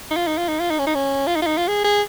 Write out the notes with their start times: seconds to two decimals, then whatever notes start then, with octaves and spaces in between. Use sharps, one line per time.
0.11 D#4
0.16 F4
0.27 D#4
0.38 F4
0.49 D#4
0.60 F4
0.70 D#4
0.79 C#4
0.87 D#4
0.95 C#4
1.27 F4
1.36 D#4
1.42 F4
1.46 D#4
1.57 F4
1.68 G#4
1.84 G#4